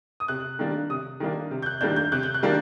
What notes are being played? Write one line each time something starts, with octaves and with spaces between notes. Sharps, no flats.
D#6
C3 F#6
D#3 G3 A#3 D4
C3 D#6
D#3 G3 A#3 D4
C3
G6
F#6
D#3 G3 A#3 D4 G6
G6
C3 F#6
G6
F#6
D#3 G3 A#3 D4